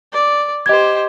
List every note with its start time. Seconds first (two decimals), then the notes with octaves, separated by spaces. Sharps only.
0.12 D5
0.66 G4 C5 D#5 G#6